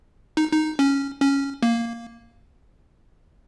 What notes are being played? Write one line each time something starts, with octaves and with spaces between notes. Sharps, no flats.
D#4
D#4
C#4
C#4
A#3